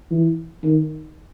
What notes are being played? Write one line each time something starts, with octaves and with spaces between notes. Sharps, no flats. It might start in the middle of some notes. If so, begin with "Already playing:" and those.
E3
D#3